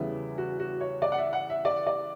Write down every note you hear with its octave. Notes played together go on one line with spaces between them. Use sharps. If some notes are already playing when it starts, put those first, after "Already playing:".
Already playing: E2 C#3 G3 B3 E4
F#4
F#4
C#5
D5
F#5
E5
F#5
E5
D5
D5